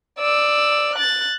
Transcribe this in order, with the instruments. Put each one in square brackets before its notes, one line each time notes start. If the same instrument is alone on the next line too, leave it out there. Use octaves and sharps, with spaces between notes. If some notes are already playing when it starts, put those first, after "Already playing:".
[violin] D5 E6
F#6 A6